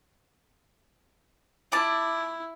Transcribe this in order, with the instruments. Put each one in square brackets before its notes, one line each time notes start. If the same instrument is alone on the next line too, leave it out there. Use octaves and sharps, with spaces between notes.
[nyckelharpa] E4 [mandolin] D5 A5